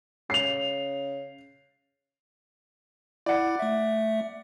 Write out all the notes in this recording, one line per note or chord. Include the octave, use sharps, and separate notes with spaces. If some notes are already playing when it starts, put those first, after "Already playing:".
C#3 C7 F7
E4 D5 F#5
A3 E5